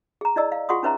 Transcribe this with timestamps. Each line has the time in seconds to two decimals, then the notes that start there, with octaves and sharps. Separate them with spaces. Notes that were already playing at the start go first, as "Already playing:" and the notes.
0.21 G#4 A#5
0.36 E4 D5 D#5 E6
0.52 F5
0.69 F4 G#4 F#5 C6 C#6 D#6
0.83 C#4 D#4 B4 C#5 E5 A#5